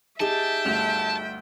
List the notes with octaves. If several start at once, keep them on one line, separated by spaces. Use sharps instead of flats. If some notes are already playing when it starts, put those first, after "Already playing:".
D#4 G4 G#4 E5 G5 A5
G1 D2 F7